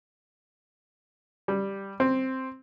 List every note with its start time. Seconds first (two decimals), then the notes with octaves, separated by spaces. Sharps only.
1.48 G3
2.00 C4